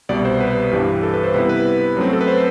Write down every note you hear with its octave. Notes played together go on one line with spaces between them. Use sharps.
C2 B2 G3 B3 D5
C5
B4
G2 E3 G3 D4
A4
B4
C5
C3 G3 B3 E4 B4
B4
F#2 F#3 A3 C4
A4
B4
C5